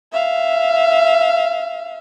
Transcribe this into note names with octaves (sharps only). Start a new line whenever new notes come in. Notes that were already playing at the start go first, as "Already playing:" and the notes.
E5 F5